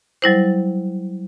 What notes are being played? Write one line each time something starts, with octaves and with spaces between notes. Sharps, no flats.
F#3 G3 E4 C5